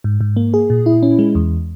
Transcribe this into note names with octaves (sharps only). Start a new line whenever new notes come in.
G#2
G#2
A#3
G#4
A#2
E4
C#4
G#3
E2